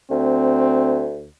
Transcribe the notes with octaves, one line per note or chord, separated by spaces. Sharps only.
D2 C4